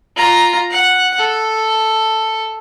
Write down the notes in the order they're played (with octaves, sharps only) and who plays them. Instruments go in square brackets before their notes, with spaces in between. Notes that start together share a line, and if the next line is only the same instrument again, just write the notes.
[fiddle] F4 A#5
F#5
A4